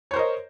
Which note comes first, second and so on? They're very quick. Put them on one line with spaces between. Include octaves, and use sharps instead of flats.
C#5 C5 A#4 D#5